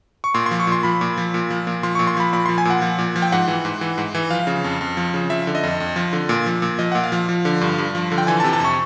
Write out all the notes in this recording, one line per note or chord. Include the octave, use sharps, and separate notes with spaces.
C#6
A#2 C6
C6
F3
C#6
A#2
C6
F3 B5
A#2
F3
A#2
F3
A#2
F3 C6
C#6
A#2
C6
F3 B5
A#2 B5
F3 C6
G#5
A#2 F#5
F3
A#2
F3
G5
G#2 F#5
E3
G#2
E3
G#2
E3
F3 F5
C#3
F2
F2
F3
C#3
F3 E5
D3
D#5
F2
F2
F3
D3
A#2
F3
A#2
F3 D#5
A#2 F#5
F5
F3
F3
D3
G2
G2
F3
D3
G5
E3 G#5
A5
C3
A5
F2 C#6